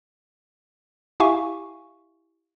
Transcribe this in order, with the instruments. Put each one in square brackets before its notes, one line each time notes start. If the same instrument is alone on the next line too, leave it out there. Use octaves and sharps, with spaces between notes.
[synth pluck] E4 G4 E5 F5 G#5 C#6